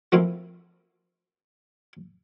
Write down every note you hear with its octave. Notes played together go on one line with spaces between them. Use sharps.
F3 A3 A#3 C4 E4 F4